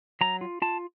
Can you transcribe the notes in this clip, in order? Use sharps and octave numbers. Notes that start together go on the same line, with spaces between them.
F#3 A#5
F4
F4 A5